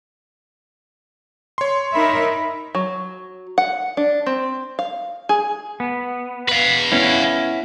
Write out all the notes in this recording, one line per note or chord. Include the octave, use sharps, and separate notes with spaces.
C#5 C6
D#4 A#4 E5 B5
F#3
F#5
D4
C4
F5
G#4
B3
B4 F5
B3 C#4 E4